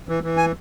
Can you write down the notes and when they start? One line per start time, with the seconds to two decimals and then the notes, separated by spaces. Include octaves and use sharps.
0.09 E3
0.23 E3
0.37 G#5